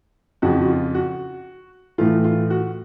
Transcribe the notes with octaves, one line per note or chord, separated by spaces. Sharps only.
F2 C#3 F3 F#4
F#4
F4
F#4
A2 E3 A3 F4
F4
F#4